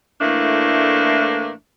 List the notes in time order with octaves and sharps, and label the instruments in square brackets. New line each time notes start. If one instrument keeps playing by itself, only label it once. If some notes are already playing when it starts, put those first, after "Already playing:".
[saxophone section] A2 E3 A3 A#3 D4